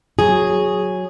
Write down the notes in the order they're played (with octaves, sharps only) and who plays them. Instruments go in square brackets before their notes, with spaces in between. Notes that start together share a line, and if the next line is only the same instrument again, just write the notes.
[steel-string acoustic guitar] F#3 G#4